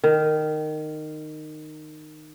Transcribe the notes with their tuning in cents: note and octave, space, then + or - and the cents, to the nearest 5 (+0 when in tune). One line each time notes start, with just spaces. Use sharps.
D#3 -15